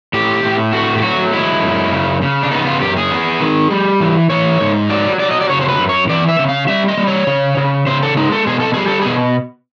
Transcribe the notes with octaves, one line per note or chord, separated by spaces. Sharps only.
A2 G4
A2
A3 F#4
G4
F#3 F#4
G#3 E4
F#2
C#3
C#3
D4
B3 D#4
F4
F#2 G4
G#4
B3
D#3
G3
E3
E3 C#5
G#2
F#3 D5
F#3 D5
D#5
D5
C#3 C#5
C5
B4
F#2
C#5
E3 D5
E5
C#3
F5
G3 E5
D#5
G3
C#5
C#3
C#3
C#3 C5
A4
G#3 D#4
A4
B2 G#4
A4
G3 G#4
A4
B2 G#4